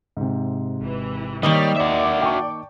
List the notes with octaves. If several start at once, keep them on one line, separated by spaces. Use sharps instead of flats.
G#2 C3
G#1 E3
D#3 G3 A#3 C5 C#5 D#5 F6
F#4 D5 E5
G5 A5 C#6